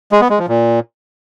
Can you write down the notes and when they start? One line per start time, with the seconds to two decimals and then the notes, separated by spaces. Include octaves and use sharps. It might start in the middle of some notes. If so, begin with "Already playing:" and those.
0.12 G#3
0.21 B3
0.30 G#3
0.39 F3
0.48 A#2